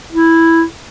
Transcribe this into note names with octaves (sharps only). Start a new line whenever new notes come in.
E4